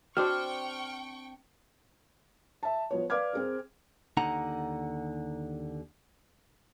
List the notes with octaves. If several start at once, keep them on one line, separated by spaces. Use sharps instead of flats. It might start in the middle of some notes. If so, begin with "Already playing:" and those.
C4 D4 F#4 C5 G5 C#6 F6
E5 A5
F3 B3 C#5
B4 D5 F5 D6 F6 G#6
C4 G#4 A#4
D#2 D3 D#4 F#5 A#5